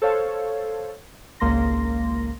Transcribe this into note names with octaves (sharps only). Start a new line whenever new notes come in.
A4 C5 C#5 F5
G#1 C#2 A#3 C6 A#6